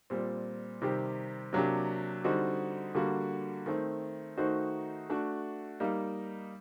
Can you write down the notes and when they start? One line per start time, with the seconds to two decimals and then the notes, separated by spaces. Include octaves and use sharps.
0.10 A#2 G3 C4
0.82 C3 D#3 G3 C4 G4
1.53 C3 F#3 A#3 D4 G4
2.24 D3 G3 C4 D#4 F#4
2.95 D3 G3 A#3 F#4
3.66 D#3 A3 C4
4.37 D#3 A3 D#4 F#4 C5
5.09 A3 D4 F#4
5.80 G3 A#3 D#4